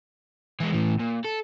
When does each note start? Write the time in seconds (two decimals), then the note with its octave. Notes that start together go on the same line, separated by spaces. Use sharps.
0.60 E3 G#3
0.72 A2 E3
1.00 A#2
1.25 A4